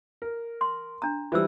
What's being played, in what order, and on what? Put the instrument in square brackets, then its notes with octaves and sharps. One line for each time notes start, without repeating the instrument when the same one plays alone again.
[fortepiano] A#4
[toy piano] C6
D4 A#5
[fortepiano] E3 G3 [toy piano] F4 C5 E6